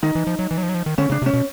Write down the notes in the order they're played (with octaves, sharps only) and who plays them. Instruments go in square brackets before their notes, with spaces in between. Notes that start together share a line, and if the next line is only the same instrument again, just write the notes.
[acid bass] D#3 [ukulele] D#4
[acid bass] E3
F3
F#3
E3
F#3
F3
F#3
F3
D#3
[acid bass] D3 [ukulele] C#4
[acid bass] C#3 [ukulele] D4
[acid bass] C3
[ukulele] C#4
[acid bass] B2